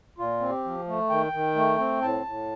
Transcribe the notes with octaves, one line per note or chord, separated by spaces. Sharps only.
A#2 F4
C4
G4
F3
A3
D#3 G5
D#3
A3
C4
A2 A5
A2